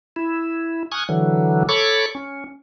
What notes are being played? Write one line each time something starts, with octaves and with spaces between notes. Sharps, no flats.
E4
G#5 C#6 D#6 F6 F#6 G#6
D3 E3 F#3
A4 C#5 B5 C#6 D6
C#4